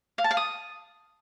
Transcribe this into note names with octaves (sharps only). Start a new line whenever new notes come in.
F5
A5
F5
D#6